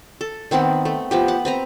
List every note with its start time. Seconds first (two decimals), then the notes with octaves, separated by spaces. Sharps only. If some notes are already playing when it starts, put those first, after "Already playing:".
0.21 A4
0.51 D#3 B3 C4 F#5
0.85 A3
1.11 F3 B3 G4
1.28 F#5
1.45 C4 B4 A#5